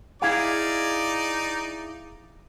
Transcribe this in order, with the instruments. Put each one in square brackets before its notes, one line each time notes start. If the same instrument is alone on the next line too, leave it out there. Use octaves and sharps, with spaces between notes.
[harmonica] D#4 D5 [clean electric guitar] E4 G#4 F5